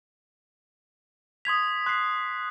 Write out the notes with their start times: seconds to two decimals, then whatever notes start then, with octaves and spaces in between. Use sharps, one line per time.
1.45 C6 D#6 G#6 B6 F7
1.86 C6 F#6 C7